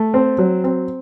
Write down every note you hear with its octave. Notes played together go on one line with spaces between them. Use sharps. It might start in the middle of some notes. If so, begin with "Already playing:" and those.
Already playing: A3
C4
F#3
C4